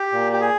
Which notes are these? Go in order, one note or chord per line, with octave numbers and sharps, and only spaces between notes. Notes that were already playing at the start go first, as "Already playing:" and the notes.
Already playing: G4
A#2
G4
G#4